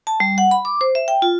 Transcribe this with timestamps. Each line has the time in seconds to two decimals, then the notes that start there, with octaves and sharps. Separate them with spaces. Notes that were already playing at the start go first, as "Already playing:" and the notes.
0.07 A5
0.20 G3
0.38 F#5
0.51 B5
0.65 D6
0.81 C5
0.95 E5
1.08 G5
1.22 F4